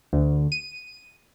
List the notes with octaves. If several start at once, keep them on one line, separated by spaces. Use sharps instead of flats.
D2
D#7